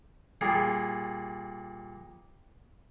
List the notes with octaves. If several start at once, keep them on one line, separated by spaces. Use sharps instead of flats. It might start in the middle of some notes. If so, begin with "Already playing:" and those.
A#2 G3 G#4